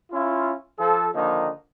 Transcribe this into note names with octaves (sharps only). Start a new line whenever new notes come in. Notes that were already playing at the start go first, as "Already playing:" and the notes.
C#4 E4 F4
F3 A4
D3 D#3 F3 A#3 D#4